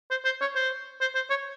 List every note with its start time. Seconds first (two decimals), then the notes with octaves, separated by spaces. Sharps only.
0.11 C5
0.25 C5
0.41 C#5
0.56 C5
1.01 C5
1.15 C5
1.30 C#5